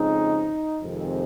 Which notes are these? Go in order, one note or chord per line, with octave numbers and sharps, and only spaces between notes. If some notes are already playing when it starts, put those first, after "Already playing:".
Already playing: F2 C#3 G#3 C4 D#4
F2 C3 D#3 G#3 C4